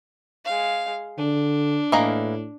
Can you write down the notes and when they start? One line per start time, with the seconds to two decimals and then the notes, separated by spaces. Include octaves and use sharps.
0.45 G#3 F5
1.18 D3 D4
1.92 A2 E3 A#3 D#5